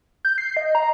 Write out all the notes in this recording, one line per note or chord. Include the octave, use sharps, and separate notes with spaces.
G6
C7
D#5
A#5